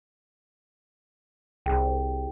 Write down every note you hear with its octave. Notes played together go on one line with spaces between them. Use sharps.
C2 G#4 G5